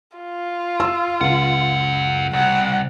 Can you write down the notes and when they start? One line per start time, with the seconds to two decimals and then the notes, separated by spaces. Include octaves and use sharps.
0.18 F4
0.80 F5 C6 E6
1.21 C#2 F#2 F#5
2.33 C2 F#5